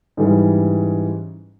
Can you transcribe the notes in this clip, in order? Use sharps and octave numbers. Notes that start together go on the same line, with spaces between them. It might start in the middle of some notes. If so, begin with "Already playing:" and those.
G#2 E3 G3 C#4